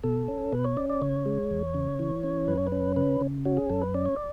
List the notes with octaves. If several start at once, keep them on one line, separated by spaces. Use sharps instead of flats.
B2 A4
C#4
B2 B4
C#5
C#4 D5
D5
C#3 C#5
G#3
E2
C#3
E3
C#4
F#2 B4
C#5
B4
C#4
C#3 B4
C#3
C#4 F#4
G#4
F#2 A4
B4
C#4 D5
C#5
D5